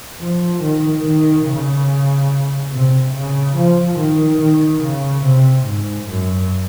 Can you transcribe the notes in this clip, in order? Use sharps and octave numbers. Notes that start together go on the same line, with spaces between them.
F3
D#3
D#3
C#3
C3
C#3
F3
D#3
D#3
C#3
C3
G#2
F#2